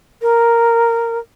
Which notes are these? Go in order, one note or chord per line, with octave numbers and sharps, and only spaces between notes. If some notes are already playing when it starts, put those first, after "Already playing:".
A#4